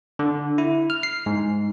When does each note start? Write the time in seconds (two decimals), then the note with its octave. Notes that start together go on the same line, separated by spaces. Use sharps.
0.19 D3
0.58 E4
0.90 F6
1.03 C7
1.26 G#2